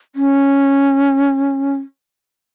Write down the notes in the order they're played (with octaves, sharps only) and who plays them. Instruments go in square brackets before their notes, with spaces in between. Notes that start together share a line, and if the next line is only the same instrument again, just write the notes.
[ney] C#4